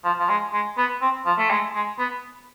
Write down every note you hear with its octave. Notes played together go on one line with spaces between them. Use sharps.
F3
F3
G#3
G#3
B3
C4
F3
A3
G#3
G#3
B3